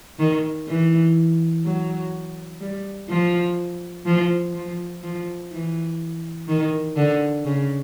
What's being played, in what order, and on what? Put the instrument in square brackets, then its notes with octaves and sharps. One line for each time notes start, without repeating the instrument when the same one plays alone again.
[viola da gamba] D#3
E3
F#3
G3
F3
F3
F3
F3
E3
D#3
D3
C#3